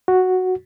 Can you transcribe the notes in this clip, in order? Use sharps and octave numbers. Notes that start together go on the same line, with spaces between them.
F#4